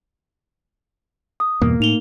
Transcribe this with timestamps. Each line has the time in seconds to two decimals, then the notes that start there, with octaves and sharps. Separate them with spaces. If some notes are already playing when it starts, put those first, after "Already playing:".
1.40 D#6
1.62 E2 G2 B2 A#3
1.80 A2 D#4 F7 G7